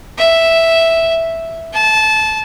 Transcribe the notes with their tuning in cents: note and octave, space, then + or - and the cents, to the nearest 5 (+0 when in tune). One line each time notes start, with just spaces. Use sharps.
E5 +0
A5 -20